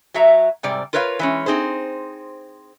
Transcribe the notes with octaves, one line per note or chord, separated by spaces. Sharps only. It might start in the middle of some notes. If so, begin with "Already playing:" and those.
F#3 F#4 E5 A#5
G#2 C3 G3 D5
F4 A#4 B4 C#5 D#5 F5
E3 G#3 C#4
C4 D#4 G#4 C5